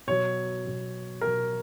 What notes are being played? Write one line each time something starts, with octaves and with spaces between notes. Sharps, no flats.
B2 F#3 C#5
B2 F#3
B2 F#3 A#4